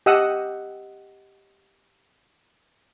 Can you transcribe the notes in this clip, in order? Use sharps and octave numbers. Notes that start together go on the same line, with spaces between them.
G4 D#5 F#5 D#6 E6